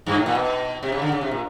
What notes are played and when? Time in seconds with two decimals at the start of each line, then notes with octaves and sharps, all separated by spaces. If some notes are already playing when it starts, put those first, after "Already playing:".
0.06 G2
0.16 A2
0.26 A#2
0.35 B2
0.83 C3
0.92 C#3
1.02 D3
1.12 C#3
1.21 C3
1.31 A#2